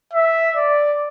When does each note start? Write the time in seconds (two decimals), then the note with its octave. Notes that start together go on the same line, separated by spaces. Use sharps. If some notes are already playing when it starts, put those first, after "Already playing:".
0.13 E5
0.56 D5